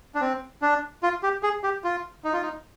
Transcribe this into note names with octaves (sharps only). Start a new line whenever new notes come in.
D4
C4
D4
F4
G4
G#4
G4
F4
D#4
F4
D#4